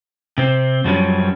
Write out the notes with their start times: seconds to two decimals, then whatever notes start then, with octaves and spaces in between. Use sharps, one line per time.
0.38 C3 C4
0.84 F#2 F3 G3 C#4